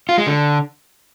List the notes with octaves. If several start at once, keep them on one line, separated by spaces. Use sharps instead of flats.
F4
G#3
D3